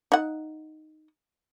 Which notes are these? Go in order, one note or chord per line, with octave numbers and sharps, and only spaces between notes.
D#4 F#5